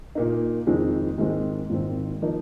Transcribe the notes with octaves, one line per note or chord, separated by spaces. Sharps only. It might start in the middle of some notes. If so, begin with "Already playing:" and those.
A#2 A#3 D#4
F2 D#3 G#3 C4 D#4
G#2 D#3 G#3 C4
G#1 G#2 D#3 C4
F3 A#3 D#4